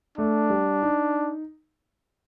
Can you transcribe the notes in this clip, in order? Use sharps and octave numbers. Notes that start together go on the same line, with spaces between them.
A3 D4
G3
D#4